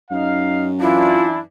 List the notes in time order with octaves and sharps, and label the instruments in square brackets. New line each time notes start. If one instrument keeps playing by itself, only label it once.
[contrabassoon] F#2 [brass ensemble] D#4 F5
[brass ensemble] E3 D4 [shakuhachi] E4 [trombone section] F4